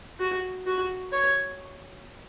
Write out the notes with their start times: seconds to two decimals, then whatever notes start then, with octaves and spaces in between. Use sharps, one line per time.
0.20 F#4
0.66 F#4
1.12 C#5